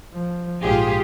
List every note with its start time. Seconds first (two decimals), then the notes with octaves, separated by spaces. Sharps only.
0.14 F3
0.62 A#1 G#2 F4 G4 G#4